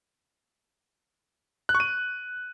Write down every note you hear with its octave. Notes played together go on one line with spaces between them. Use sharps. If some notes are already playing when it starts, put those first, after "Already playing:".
F#6
C#6
D#7